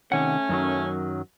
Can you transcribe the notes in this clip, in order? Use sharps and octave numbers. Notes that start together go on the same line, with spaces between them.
C3 D#3 A3 C#4 F#5
F#2 D#3 F#3